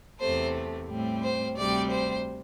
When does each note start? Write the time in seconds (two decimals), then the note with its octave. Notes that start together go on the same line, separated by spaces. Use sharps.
0.20 E2 C3 A3 C5
0.88 A2 G3 C4
1.23 C5
1.57 D2 C3 G3 C4 D5
1.91 C5